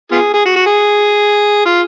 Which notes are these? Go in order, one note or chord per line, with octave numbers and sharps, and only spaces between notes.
B3 F4 G#4
G#4
F#4
F#4
G#4
F4